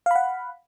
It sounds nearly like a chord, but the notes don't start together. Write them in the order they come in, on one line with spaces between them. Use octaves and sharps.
F5 B5 F#5